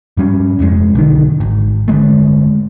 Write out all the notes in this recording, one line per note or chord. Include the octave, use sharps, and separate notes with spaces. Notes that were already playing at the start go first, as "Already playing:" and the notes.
G2 G3 C#4
F1 F2 C3 G#3
B1 D3 D#3
G#1
G1 D3 G#3 A3